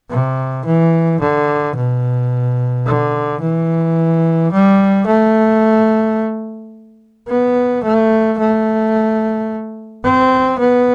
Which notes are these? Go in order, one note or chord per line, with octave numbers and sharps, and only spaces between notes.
C3
E3
D3
B2
D3
E3
G3
A3
B3
A3
A3
C4
B3